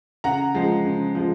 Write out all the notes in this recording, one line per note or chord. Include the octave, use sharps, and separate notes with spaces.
C#3 F#5 A#5
F3 G#3
C#3
F3 G#3